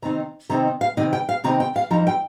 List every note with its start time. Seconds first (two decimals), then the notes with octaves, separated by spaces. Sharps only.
0.02 C3 D#3 C4 D#4 A#5
0.49 C3 D#3 C4 D#4 A#5
0.81 F5
0.97 C3 D#3 C4 D#4 D#5
1.13 G5
1.29 F5
1.44 C3 D#3 C4 D#4 A#5
1.60 G5
1.76 F5
1.91 F2 F3 D#4 A#5
2.07 G5